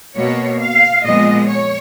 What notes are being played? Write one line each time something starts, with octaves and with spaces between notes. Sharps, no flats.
B2 A#3 C#5
F5
A#2 F3 G#3 B3 D#5
C#5